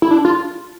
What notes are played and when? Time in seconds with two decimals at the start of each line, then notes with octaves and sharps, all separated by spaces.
0.02 E4
0.11 D4
0.25 F4